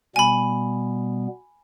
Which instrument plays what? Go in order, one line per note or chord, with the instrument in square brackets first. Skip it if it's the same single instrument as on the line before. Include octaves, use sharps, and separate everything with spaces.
[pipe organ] B2 G3 B3 [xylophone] G#5 B5